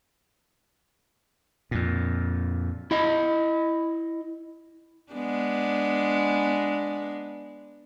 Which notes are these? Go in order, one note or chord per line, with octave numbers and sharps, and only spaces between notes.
F2 A#2
E4 D#5
G#3 B3 D4